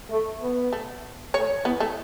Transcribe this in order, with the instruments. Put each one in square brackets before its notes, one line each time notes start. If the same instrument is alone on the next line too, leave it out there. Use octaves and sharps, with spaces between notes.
[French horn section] A3
B3
[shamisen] A3
[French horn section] A3 [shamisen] C#5
[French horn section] E3 [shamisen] B3
[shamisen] A3